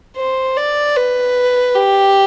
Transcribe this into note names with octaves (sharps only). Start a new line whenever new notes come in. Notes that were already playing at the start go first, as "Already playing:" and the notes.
C5
D5
B4
G4